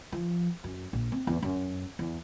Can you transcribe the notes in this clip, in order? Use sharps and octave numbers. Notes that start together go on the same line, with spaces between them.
F3
F#2
A#1
C4
E2
F#2
E2